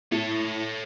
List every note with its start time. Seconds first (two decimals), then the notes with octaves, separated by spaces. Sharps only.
0.12 A2 A4 C#5